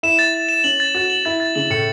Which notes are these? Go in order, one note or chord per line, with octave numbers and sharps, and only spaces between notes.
E4 E7
A6
A6
E7
C#4 F#7
A6
F#4 A6
F#7
E4 A6
A6
C#3 F#7
A2 C#7